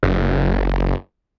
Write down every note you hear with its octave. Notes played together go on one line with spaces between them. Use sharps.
F#1